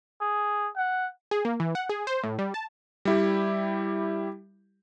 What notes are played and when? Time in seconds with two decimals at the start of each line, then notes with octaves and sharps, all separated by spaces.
0.21 G#4
0.77 F#5
1.31 G#4
1.45 A#3
1.60 E3
1.75 F#5
1.89 G#4
2.07 C5
2.23 A2
2.39 G3
2.54 A5
3.05 G3 E4 G4